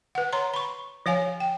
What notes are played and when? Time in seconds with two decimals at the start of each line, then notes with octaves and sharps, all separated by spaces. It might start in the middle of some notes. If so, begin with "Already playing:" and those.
0.15 B4 F#5
0.33 C#5 A#5 C6
0.54 B5 C#6
1.06 F3 C#5 F5 G#5
1.40 G5